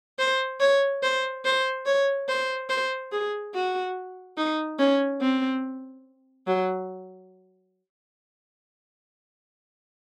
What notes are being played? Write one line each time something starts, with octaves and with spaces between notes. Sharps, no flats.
C5
C#5
C5
C5
C#5
C5
C5
G#4
F#4
D#4
C#4
C4
F#3